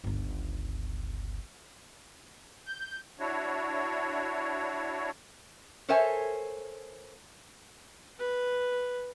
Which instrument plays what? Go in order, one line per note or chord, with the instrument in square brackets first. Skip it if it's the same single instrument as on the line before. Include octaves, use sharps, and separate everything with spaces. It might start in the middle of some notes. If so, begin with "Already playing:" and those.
[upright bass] G1 C#2
[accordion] G6
D4 E4 F#4 C#5
[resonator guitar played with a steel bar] A4 A#4 C5 C#5 E5 G#5
[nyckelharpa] B4